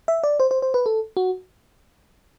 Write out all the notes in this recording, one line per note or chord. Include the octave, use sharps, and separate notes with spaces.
E5
D5
C5
C5
C5
B4
A4
F#4